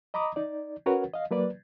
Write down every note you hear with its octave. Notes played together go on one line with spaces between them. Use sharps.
D#5 A#5 B5 D6 D#6
D#4 D5
C#4 F#4 A#4 B4 C#5 F#5
D#5 F5
F#3 A#3 B4 D5